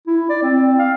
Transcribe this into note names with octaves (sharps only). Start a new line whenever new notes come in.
E4
D5
C4
F5